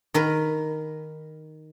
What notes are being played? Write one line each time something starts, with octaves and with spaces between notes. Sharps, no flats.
D#3 A#4 B4